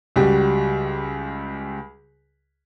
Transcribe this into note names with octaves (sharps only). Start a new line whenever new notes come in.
C#2 G3 F#4